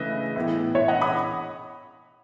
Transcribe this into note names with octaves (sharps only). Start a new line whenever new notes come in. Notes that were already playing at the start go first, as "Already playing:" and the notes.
Already playing: C#3 E3 A3 B4 D#5 E5
A2 E3 B3 E4
C#5 E5
D#5 F#5
B5 D#6